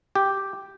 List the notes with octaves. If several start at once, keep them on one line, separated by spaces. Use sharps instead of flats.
G4